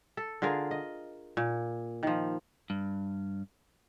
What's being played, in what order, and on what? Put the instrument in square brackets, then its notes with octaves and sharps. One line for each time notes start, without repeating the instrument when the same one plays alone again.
[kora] A4
D3 F4 G#4 A#4
D#5
A#2
D#3 F3
[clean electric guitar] G2